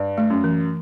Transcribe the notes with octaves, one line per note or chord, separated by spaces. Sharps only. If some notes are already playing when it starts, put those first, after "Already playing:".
Already playing: G2
A3
F#2
E3